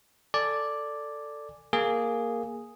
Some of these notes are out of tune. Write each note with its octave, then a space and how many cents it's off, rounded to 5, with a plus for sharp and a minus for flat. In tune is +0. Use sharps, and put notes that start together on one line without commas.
A4 +10 D5 +0 G#5 +0
A#3 +0 G#4 +0